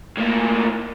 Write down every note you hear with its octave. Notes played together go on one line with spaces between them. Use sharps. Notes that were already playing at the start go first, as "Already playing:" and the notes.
A2 A#3